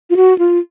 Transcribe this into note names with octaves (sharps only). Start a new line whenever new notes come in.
F4
F#4
F4